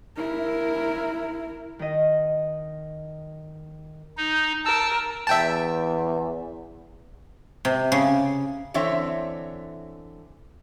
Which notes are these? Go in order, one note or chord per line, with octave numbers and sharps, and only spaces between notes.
E4 A#4
D#3 D#5
D#4
A#4 A5 E6
E2 E5 G5 A5
C3
C#3
D3 E3 C4 C#5 E5